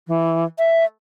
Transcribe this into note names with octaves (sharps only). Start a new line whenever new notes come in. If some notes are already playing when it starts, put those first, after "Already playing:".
E3
E5